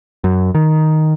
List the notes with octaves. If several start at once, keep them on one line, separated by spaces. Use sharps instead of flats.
F#2
D#3